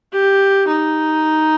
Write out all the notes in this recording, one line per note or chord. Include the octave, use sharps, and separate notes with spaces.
G4
D#4